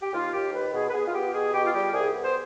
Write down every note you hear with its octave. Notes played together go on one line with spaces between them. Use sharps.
G4
D#2 F4
D#2 G4
D#3 B4
B2 G#4
B4
B3 G#4
F4
B3 G4
B2 G#4
B2 G4
F4
G3 G4
C2 G#4
B3
C5